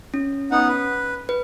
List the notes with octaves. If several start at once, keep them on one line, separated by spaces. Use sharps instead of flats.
C#4
B3 D#4 F#5
B4
B4